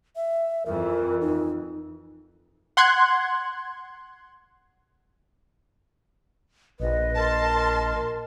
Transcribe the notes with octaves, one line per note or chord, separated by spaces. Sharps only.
E5
F2 E3 A#4
D#4
F#5 C6 F#6 G#6
A#1 B4 D#5
A#4 A5 C6